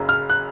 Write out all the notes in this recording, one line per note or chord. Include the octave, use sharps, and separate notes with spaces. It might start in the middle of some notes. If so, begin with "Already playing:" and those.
Already playing: F#1 F#2 C#3
F6
F#6